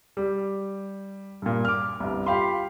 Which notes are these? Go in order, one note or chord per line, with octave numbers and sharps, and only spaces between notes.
G3
G2 A#2
D6 F6
G1 C2
F4 G4 F5 B5 C6